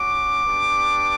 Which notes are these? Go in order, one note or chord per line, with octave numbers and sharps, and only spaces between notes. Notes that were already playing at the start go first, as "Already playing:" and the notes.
Already playing: C#4 F#4 D6
B3 D4 G4